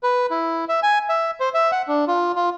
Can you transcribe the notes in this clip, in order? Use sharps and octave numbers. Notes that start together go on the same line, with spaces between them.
B4
E4
E5
G#5
E5
C5
E5
F#5
D4
F4
F4